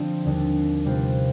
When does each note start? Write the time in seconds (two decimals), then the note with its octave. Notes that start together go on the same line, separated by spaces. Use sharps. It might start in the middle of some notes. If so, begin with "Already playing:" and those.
Already playing: D3 F3 C4
0.25 D#2 D3 G3 D4
0.85 C3 G3 B3 F4 C5